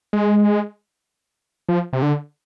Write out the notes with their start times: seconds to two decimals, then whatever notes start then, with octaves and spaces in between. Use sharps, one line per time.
0.13 G#3
1.69 F3
1.93 C3
2.02 D3